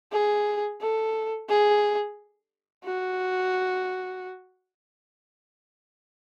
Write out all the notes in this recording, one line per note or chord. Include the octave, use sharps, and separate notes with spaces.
G#4
A4
G#4
F#4